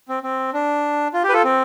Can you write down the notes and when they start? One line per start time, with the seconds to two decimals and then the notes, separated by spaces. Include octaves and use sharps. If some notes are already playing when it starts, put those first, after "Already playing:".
0.09 C4
0.23 C4
0.53 D4
1.14 F4
1.24 G4
1.29 B4
1.33 F4 A4
1.44 C4